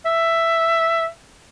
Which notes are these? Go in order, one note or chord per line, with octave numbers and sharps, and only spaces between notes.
E5